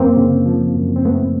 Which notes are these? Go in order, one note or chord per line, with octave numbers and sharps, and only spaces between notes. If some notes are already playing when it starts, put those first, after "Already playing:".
Already playing: F#2 A#3 C4
C#3
F3
F#2
C4
F#2 A3 B3